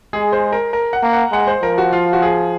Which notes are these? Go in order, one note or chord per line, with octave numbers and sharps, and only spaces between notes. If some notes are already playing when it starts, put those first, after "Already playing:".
G#3 G#4
C5
A#4
A#4
F#5
A#3
F#5
G#3 F#5
C5
F3 A#4
F#4
F4
F#4
G#4